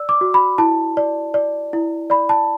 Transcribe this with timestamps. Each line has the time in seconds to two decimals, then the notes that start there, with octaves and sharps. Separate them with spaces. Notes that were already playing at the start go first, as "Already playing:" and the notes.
Already playing: D5 E6
0.09 D6
0.21 F#4
0.34 B5
0.58 E4 A5
0.97 D5
1.34 D5
1.73 E4
2.10 D5 B5
2.29 A5